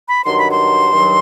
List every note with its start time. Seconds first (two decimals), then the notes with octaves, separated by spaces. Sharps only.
0.09 B5
0.25 G2 D#3 F#3 C6
0.38 B5
0.51 C6
0.93 G2 D#3 F#3